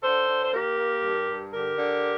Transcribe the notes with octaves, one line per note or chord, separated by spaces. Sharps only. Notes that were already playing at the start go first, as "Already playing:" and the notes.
D3 A4 C5
D3
C5
A#3 G4 A#4
A#3
G2
G2
D3 G4 A#4
D3